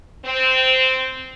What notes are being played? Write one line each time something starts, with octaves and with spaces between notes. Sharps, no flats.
C4